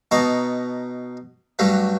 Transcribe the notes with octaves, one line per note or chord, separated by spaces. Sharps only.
B2 D#4 A5 A#5 C#6
G2 F#3 G3 A3